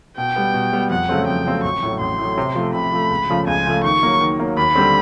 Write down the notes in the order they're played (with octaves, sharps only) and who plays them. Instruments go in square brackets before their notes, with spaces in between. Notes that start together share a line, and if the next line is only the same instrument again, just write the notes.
[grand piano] B2 [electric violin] G5
[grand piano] G3 B3
B2
G3 B3
[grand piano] F2 [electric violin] F#5
[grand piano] C#3 F#3 A3 C4
[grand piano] F2 [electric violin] G5
[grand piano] C#3 F#3 A3 C4
[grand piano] A1 [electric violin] C#6
[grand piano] A2 F#3
[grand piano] A1 [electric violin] C6
[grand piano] A2 F#3
C3
F3 A3
[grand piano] C3 [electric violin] B5
[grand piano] F3 A3
C#2
C#3 F3 A3
[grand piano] C#2 [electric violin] G#5
[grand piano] C#3 F3 A3
[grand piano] D#3 [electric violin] C#6
[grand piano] F#3 A#3
D#3
F#3 A#3
[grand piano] D#2 [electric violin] B5
[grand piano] D3 G3 C4